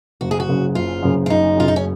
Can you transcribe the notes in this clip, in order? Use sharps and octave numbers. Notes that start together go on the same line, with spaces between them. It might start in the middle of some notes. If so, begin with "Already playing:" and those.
F#1 F#4
G#4
F#4
F#2 C#3
F#1 F4
F#2 C#3
F4
F#1 D#4
F#2 C#3 F4
D#4
C#4